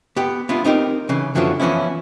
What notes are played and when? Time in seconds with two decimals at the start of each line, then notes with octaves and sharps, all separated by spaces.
0.16 B3 G4
0.49 B3 D4 E4 F4
0.64 C4 D#4 G4 A#4
1.09 C#3 E3
1.35 F#2 D3 F3 F#3 B3 E4
1.60 E3 F3 B3 C#4 E4